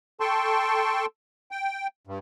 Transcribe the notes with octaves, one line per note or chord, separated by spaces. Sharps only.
A4 G5 A5 C6 C#6
G5
G2